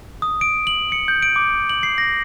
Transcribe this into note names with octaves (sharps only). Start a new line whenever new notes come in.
D#6
D7
F#7
C#7
G6
D7
D6
F#7
C7
A#6